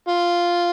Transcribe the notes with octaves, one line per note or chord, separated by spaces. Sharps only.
F4